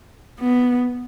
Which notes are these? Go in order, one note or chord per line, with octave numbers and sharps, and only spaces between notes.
B3